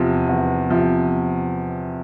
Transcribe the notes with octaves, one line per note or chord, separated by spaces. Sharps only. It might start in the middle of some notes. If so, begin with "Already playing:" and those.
Already playing: E2 C3 F3
E2
C3 F3